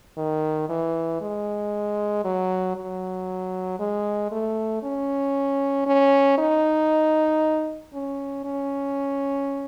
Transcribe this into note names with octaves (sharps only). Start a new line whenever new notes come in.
D#3
E3
G#3
F#3
F#3
G#3
A3
C#4
C#4
D#4
C#4
C#4